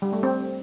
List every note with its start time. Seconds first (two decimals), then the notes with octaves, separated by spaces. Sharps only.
0.02 G3
0.13 A3
0.23 C4